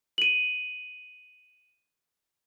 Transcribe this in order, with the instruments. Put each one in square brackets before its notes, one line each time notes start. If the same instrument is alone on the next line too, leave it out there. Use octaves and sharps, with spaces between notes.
[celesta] D#7 F#7